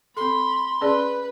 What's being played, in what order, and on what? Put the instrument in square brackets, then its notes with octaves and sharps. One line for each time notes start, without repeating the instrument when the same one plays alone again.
[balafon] C4 A4 [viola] B5 [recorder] C6
[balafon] C#4 G#4 D5 [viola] B4